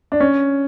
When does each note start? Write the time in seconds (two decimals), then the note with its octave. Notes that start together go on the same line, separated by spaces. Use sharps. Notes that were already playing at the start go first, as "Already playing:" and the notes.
0.12 D4
0.20 C#4